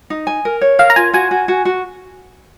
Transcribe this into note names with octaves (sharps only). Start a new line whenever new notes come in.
D#4
G#5
A#4
C#5
A#4 F5
A#5
F4 G#5
F#4 G#5
F#4
F#4
F#4